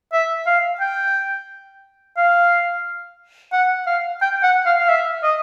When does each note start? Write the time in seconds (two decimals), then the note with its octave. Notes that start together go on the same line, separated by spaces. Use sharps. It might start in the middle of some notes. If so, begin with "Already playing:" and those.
0.13 E5
0.47 F5
0.80 G5
2.17 F5
3.53 F#5
3.87 F5
4.22 G5
4.43 F#5
4.66 F5
4.79 F5
4.89 E5
5.23 D#5